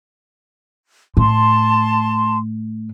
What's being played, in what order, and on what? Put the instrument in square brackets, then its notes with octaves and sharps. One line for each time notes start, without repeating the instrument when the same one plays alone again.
[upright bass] A2 [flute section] A5 C6